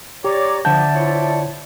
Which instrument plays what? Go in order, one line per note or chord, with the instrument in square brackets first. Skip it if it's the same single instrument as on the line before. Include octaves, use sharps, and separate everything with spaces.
[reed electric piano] G4 [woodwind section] C#5 A#5 [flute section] D5 D6
[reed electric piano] D3 F#5 G6 [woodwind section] F3 [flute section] D5 E5 [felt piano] A5
[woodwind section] F3 E4 C#5